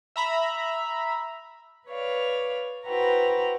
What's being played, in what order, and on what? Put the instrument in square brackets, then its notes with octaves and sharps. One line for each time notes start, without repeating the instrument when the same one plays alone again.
[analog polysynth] E5 A#5 B5
[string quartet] B4 C#5 D5 F5
E4 F#4 B4 C5 G5 A#5